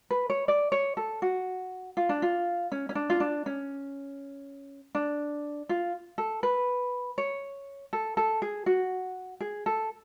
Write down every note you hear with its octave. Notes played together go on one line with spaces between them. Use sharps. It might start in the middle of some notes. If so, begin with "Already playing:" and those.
B4
C#5
D5
C#5
A4
F#4
F4
D4
F4
C#4
C#4
D4
F4
D4
C#4
D4
F4
A4
B4
C#5
A4
A4
G#4
F#4
G#4
A4